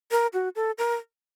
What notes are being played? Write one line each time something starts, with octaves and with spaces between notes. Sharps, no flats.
A#4
F#4
A4
A#4